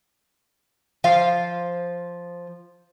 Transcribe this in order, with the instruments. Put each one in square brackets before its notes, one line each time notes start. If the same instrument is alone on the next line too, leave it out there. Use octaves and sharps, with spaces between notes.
[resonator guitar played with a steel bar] F3 C5 F5